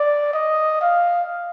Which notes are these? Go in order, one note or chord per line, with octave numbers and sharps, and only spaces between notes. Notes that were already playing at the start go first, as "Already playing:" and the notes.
Already playing: D5
D#5
F5